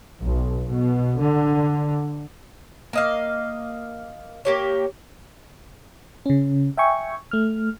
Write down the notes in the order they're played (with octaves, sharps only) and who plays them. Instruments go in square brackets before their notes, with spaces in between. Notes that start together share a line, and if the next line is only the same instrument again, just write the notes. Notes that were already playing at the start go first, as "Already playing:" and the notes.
[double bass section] B1
B2
D3
[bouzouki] A#3 D#5 F5
A#3 G4 C#5
[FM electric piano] C#3 C#4
E5 G5 G#5 C#6
A3 F6